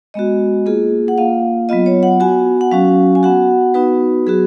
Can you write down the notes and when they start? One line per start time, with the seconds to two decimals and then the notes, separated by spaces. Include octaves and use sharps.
0.14 G#3 B3 F#4 D#5
0.66 A#3 F4 G#4
1.08 F#5
1.18 A#3 F4 F5
1.69 F#3 B3 F4 D#5
1.86 C#5
2.03 F#5
2.20 B3 F#4 G#5
2.61 F#5
2.71 F#3 C#4 F#4 F5
3.15 G#5
3.23 B3 F#4 F#5
3.74 B3 D#4 F#4 B4
4.27 F#3 B3 F#4 G#4